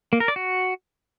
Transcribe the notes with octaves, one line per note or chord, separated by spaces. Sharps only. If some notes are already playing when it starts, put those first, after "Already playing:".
A#3
A#4
D5
F#4